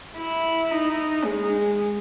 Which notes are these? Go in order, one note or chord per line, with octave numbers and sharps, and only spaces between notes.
E4
D#4
G#3